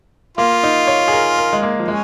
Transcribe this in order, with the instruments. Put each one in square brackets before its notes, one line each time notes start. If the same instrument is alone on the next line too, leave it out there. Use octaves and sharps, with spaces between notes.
[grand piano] A#3 [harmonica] F4
[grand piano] D#4
C#5
G#4
A#4
A#4
G#3
A#3
F3
[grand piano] G#3 [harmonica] C#4